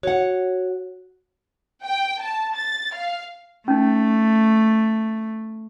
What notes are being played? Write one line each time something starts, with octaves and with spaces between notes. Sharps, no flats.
F#4 C#5 F#5
G5
A5
A6
F5
A3 C#4 D#4